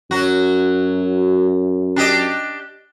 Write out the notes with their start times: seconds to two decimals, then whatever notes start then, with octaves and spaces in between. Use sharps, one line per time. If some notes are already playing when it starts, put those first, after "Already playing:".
0.11 F#2 F#3 F#4
1.96 D4 G4 D#5